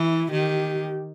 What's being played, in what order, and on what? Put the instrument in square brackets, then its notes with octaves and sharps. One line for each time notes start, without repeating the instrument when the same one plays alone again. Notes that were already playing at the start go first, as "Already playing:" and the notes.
Already playing: [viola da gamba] E3 [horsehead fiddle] E4
[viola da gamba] D#3 [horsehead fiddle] G4